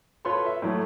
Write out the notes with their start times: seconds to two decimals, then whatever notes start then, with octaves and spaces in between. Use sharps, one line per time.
0.25 F4 A4 B4 C#5 C6 C#6
0.46 E5
0.62 A2 E3 F#3 A3